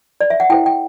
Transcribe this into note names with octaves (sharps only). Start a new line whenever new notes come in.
D5
E5
F#5
E4 A4 C5 G5
G5